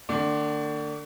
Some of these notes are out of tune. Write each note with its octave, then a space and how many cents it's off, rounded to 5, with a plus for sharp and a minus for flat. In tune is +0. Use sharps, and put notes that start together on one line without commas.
D3 +45 A3 +45 D4 +0